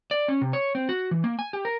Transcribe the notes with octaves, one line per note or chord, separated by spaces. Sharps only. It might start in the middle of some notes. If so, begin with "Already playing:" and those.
D5
C#4
C3
C#5
C4
F#4
E3
A#3
G#5
G4
A#4